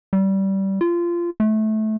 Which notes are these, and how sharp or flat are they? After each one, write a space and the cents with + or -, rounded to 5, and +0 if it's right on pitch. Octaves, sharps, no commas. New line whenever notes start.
G3 -20
F4 -20
A3 -20